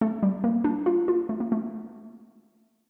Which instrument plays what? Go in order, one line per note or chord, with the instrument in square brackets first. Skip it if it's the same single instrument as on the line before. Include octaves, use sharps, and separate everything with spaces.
[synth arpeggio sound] A3
G3
A#3
D4
F4
F4
A3
A#3
A3